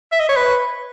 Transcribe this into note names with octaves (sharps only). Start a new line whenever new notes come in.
E5
D#5
C#5
B4